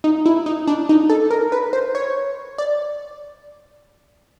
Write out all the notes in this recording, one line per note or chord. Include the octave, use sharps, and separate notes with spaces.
D#4
E4
D#4
D4
D#4
A4
A#4
B4
C5
C#5
D5